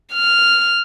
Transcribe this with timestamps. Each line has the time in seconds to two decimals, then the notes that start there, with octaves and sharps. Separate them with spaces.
0.13 F6